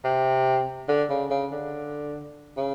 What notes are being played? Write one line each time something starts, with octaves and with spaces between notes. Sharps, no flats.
C3
D3
C#3
C#3
D3
C#3